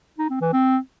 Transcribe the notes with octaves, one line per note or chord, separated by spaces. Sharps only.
D#4
C4
E3
C4